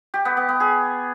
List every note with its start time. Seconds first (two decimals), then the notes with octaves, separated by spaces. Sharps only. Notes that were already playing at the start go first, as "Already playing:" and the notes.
0.14 G4
0.25 B3
0.37 B3
0.49 B3
0.60 G#4